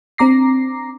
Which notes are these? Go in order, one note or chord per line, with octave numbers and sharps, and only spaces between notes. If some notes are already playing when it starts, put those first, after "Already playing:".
C4 D4 A#5 D6 A#6 C7